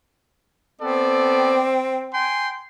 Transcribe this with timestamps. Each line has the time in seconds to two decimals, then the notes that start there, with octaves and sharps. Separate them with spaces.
0.81 B3 C4 A4 D5
2.14 G5 G#5 C6